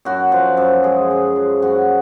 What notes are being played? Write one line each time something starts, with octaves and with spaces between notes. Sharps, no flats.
F#2 F#4
F3
F#2
G#3 G#4
F#2
F3
F#2 F#4